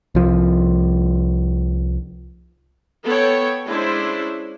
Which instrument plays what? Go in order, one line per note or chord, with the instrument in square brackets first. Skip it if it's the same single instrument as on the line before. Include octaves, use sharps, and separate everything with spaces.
[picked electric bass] C2 F3
[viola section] B3 A4 C#5 G5
G#3 C#4 D4 E4 C5